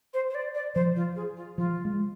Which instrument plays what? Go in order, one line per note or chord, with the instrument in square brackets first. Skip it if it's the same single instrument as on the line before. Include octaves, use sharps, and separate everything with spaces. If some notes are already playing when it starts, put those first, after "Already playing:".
[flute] C5
C5
D5
D5
[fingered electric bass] F3 [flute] C5
[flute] F4
G#4
F4
[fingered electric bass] F3 [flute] F4
[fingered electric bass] G#3